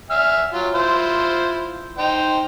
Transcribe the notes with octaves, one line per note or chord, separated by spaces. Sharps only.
E5 G#5 F6
F#3 F4
E4 F4 C5
D#4 C5 G5